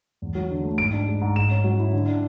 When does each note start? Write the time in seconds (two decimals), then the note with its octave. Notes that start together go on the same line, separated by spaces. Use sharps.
0.22 E2
0.35 F#3
0.51 D3
0.64 A3
0.78 G#2 D7
0.93 D4
1.08 G#3
1.21 G#2
1.36 G#2 E7
1.51 C#4
1.64 F#3
1.79 E4
1.93 D3
2.07 D4